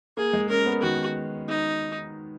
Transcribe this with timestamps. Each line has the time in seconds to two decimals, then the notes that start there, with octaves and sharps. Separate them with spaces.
0.17 A#3 G#4
0.33 G#3
0.50 C#4 A#4
0.66 B3
0.82 D#3 F#4
1.48 D#4